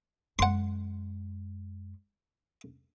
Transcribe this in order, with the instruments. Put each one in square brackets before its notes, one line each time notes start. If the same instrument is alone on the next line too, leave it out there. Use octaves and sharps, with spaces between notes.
[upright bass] F#2 G#3 [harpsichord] F#5 C6